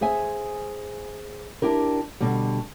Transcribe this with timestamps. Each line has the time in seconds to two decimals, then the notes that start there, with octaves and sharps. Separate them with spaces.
0.01 G#4 C5 E5 G#5
1.62 D4 E4 G4 A#4
2.21 B2 D3 G3